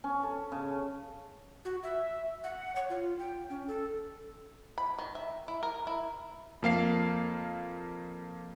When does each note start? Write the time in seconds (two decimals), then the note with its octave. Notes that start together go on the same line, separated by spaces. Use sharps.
0.04 C#4
0.23 A4
0.52 C#3
1.65 F#4
1.83 E5
2.44 F#5
2.76 C#5
2.90 F4
3.19 G5
3.50 C#4
3.68 A4
4.78 B5
4.98 D#3
5.15 E5
5.48 E4
5.63 A#4
5.87 E4
6.63 F2 A#3 F5 C7